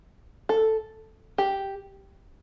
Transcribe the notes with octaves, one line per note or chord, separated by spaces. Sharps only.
A4
G4